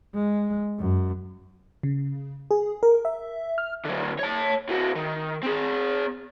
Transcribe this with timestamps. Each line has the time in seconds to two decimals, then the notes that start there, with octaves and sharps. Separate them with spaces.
0.14 G#3
0.79 F#2
1.83 C#3
2.51 G#4
2.83 A#4
3.05 E5
3.58 F6
3.85 D3 F#3
4.19 C#5 A5
4.69 A2 F#4
4.96 D#3
5.43 C4 G#4